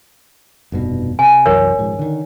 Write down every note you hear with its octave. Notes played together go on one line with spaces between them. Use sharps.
F1 G2 B2
C3 G#5
C2 F#2 E3 A#4 C#5
D#1 G#2 F3
D3 D#3